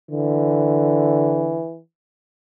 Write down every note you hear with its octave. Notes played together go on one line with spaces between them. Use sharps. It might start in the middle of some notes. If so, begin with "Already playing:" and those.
D3 E3